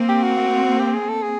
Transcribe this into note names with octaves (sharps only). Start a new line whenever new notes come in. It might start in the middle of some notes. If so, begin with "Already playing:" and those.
Already playing: A#3 C4
G4
F#4
G4
G#4
A4
G#4